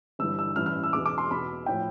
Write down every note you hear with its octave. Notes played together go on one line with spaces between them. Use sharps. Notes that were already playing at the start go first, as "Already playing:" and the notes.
G1 G2 E3 E6
E6
A1 G2 E3 F6
F6
E6
E1 E2 B2 D6
D6
C6
E2 B2 B5
A2 F3 G5